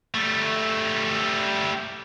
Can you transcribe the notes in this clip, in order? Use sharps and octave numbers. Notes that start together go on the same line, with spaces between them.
G3 A3